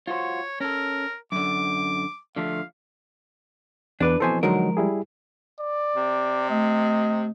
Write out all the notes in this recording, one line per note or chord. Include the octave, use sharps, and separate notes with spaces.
F4 F#4 C5 C#5
C#4 A4 A#4
F#2 D3 D6
D3 F3 A3 F5
E2 D4 B4 D6 F#6
F2 B2 E3 A4 C5 G#5
D3 F3 F#3 G#3 D#4 A#4
G3 E4 G#4
D5
C3
A3 D#5